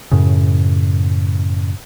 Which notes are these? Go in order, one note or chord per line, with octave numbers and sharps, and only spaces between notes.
F#2 A2 C#3